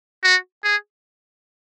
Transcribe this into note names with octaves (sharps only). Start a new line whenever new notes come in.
F#4
G#4